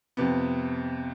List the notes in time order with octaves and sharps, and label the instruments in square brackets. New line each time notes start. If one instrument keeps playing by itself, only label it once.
[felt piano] F2 C3 B3